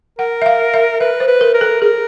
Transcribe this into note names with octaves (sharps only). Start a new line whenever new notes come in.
A#4 F#5
E5
F5
E5
B4 E5
C5
B4
A#4
A#4
A4
G#4 A#4